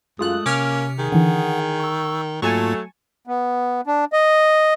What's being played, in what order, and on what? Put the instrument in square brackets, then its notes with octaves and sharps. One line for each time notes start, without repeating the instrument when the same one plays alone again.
[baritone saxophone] F#2 [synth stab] G#3 F4 F#6 [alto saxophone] A3 [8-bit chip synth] D#6
[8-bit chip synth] C3 [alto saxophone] A#3 [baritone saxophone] C#4 [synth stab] D6 F6
[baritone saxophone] D#3 [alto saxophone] G#4
[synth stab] D3 E3 [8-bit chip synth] F#5
[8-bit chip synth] C#6 E6
[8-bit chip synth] G#2 A#3 F4 [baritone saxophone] F#3 [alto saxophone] A3 [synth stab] G#5 A5 C#6
[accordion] B3
D4
D#5